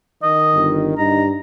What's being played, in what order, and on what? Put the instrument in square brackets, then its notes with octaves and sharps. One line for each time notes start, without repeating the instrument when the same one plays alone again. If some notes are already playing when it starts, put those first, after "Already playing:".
[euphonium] D#3 [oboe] D#5
[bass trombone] G1
[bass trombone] G2 [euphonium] D#4 [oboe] A#5